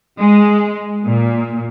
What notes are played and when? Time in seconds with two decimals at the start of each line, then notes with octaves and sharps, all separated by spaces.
0.20 G#3
1.05 A#2